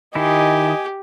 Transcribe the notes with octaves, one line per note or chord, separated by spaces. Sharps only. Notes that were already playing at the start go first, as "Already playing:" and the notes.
D#3 E4 G4 D#5 G#5